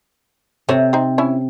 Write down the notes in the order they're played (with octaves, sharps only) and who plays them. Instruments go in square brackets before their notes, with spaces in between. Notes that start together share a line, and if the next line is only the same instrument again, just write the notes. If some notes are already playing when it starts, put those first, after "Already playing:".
[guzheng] C3 [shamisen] A4 C#5
[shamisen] C4 D#4
C#4 E4